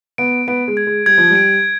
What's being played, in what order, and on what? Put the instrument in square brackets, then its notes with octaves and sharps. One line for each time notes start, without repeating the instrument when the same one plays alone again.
[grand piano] B3 [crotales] D7
[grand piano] B3 [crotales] D7
[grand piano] G#3
[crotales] G#6
[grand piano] G#3
[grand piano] G3 [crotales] G#6
[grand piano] F3
G3
[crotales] D7